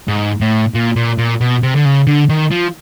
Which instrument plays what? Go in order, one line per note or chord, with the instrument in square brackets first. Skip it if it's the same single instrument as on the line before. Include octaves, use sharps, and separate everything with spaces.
[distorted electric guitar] G#2
A2
A#2
A#2
A#2
B2
C3
D3
C#3
D3
D#3
F3